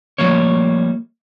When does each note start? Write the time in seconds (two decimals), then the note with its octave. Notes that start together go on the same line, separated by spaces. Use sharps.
0.18 F3 G3 A3 A#3 C#5